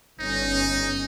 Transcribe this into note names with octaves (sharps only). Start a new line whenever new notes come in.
G1 C#4 D#4